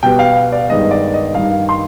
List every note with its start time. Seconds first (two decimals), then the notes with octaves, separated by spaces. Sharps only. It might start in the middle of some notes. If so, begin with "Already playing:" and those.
0.03 B2 G3 B3 G5
0.19 F5
0.52 D5
0.69 G2 D#3 G#3 B3 D#5
0.91 D5
1.14 D#5
1.35 G2 D#3 G3 F5
1.69 C6